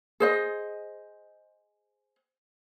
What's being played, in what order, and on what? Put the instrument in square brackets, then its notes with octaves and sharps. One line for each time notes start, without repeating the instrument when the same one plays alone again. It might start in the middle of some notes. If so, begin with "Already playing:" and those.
[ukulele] G#4 C5 D#5